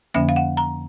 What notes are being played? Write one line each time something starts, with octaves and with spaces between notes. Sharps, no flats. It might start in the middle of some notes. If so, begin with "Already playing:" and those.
F2 D3 F3 A#3 C#4 E5
F5
F#5
A#5